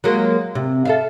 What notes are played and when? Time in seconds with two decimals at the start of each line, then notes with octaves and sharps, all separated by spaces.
0.04 F#3 G#3 A#3
0.55 C3
0.85 A4 E5 F5